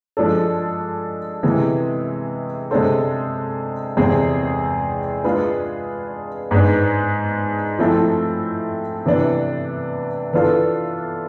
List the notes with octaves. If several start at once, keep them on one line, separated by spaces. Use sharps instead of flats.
F3 G#3 D4 A4
C3 E3 G#3 B3
C3 G#3 D4 A4 C5
E2 C3 G#3 C4 G#4
G#3 D4 F4 G#4 B4
G#2 G#3 B3 D4
F3 A3 C4 E4 A4
C3 E3 B3 D4
E3 B3 D4 F4 A4